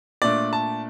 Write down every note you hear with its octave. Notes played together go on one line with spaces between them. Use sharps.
A#2 A3 D4 D5
A5